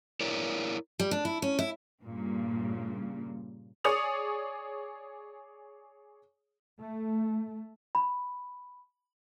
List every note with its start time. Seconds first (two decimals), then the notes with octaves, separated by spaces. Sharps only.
0.21 E4 A#4 C#5 D5
1.00 G3
1.11 D4
1.25 E4
1.42 C#4
1.59 E4
2.01 G2 A#2 C#3
3.84 G#4 C#5 D5 D#6 C#7 F7
6.80 A3
7.95 B5